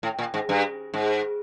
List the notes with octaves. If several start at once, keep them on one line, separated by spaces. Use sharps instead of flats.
A2
A#2
G#2
G2
G#2